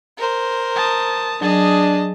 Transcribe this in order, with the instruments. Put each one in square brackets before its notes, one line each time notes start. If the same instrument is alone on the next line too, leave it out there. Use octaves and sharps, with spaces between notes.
[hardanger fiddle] A#4 C5
[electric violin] A5 D#6
[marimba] F#3 [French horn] D4 [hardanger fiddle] G#4 [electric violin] D#5 A5